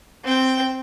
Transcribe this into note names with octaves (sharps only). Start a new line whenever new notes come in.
C4 G5